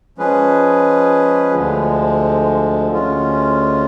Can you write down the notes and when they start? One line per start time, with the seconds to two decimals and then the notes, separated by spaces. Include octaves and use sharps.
0.18 F3 G#3 C#4 G#4 B4
1.55 D2 D3 F3 G#3
2.92 D2 D3 G#3 C#4 F4